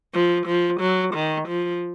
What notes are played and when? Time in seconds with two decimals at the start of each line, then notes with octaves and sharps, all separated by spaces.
0.14 F3
0.46 F3
0.80 F#3
1.14 D#3
1.48 F3